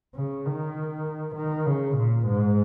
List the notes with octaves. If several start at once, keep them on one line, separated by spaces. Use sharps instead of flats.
C#3
D#3
D#3
C#3
A#2
G#2